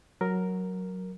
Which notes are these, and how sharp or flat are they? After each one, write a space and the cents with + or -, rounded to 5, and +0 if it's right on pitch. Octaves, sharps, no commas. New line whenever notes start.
F#3 +0 A#4 +0